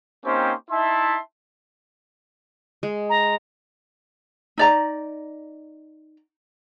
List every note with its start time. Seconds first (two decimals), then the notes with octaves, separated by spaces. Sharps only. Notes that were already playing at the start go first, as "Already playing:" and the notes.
0.25 A#3 C4 C#4 D#4 G4 C5
0.71 D#4 E4 E5 A5 C6
2.83 G#3
3.09 A#5
4.58 D#4 D5 A#5